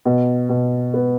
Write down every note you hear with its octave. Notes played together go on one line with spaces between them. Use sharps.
B2
B2
B3